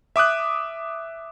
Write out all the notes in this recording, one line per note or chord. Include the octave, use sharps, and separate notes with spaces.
E5 D6 D#6 F#6